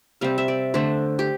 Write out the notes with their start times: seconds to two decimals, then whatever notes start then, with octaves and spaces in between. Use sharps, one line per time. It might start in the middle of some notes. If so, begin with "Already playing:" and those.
0.21 C3 G3 C4 F5
0.38 E5
0.48 D5
0.74 D3 A3 D4 C5
1.19 G4